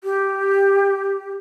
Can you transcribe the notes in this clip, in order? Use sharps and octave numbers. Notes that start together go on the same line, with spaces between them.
G4